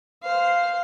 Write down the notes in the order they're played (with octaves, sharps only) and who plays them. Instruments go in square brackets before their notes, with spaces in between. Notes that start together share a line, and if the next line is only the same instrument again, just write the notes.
[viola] C5 F5